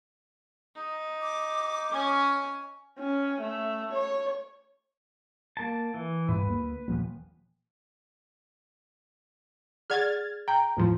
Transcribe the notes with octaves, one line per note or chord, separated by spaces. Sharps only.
D#4
D6
C#4 G#5
C#4
A3
C#5
A#3 A5
E3
G2 B4
D2 G#3 A#3
D#1 F3 A#3
G#4 D5 F#5 F6 G#6 A6
G5 A#5
E2 A2 F3